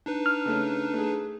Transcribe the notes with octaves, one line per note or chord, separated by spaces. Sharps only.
D4 D#4 B4
F6
C#3 A3 C#4
A3 G#4